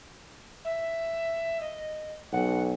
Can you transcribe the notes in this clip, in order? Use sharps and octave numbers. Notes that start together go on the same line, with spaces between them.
E5
D#5
B1 F#5